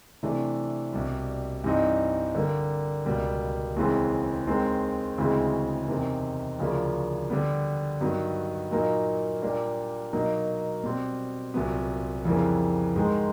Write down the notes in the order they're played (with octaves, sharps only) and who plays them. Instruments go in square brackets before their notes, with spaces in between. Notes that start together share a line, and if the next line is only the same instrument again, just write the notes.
[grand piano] C3 E3 A3 D4
C2 B2 G3
G2 E3 G3 C4 D#4
D3 G3 A#3
C#2 B2 G3 A#3
D#2 C#3 E3 G#3 C4
D#2 D#3 G#3 C4
D2 C#3 E3 G#3 C4
E2 C3 D#3
D2 C#3 F3 A#3 D4
D3 G3 B3
G2 D#3 F#3 B3
A#2 F#3 A#3 D#4
A#2 G3 A#3 D4
B2 F#3 A#3 D#4
B2 G3 C4
C2 A#2 F#3 B3
F2 C#3 E3 G3 A#3
G#2 D#3 G#3